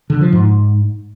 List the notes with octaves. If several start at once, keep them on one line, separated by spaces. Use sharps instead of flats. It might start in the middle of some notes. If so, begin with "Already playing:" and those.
D3
F3
G#2